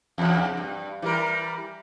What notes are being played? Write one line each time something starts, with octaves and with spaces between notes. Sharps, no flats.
E2 C#3
G2
E3 G3 A#4